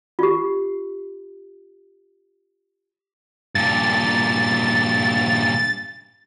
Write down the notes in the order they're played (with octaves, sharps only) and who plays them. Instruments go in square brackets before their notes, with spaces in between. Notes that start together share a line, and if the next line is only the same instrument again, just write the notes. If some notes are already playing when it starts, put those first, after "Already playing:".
[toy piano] F4 G4
[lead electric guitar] G2 A#2 [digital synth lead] A6